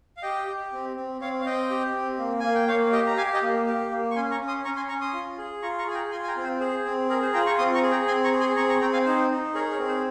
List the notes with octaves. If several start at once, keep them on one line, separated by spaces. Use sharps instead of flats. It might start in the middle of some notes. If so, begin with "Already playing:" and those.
F5
G4 D#5 G5
G4
C4
C4
C4 C#5 F5
F5
C4 D#5 G5
G4
C4
A#3
A#3 G#5
G5
A#3 C#5 F5
G4 D#5 G5
A#5
G4 F5 G#5
D#5 G5
A#3
G4
A#3
C#6
C#4 G#5 C6
A#5 C#6
C#4
C6 D#6
C#4 A#5 C#6
G#5 C6
C#4 A#5 C#6
C6 D#6
F4
G#4
F4 A#5 C#6
A#5 C#6
G#4 G#5
G5 A#5
F4 G#5 C6
G#5
G5 A#5
C4
C5
G#4 C5
C4
G#4 A#4
C5
F4 G5 A#5
A#5 C#6
C4 C6 D#6
A#5 C#6
G#4
G5 A#5
C4 G#5 C6
A#5 C#6
G#4
G#5 C6
C4 A#5 C#6
A#5 C#6
C4 G5 A#5
F5 G#5
D#4 C5
D#4
G#4 A#4 C#5
A#4 C#5
C4
C5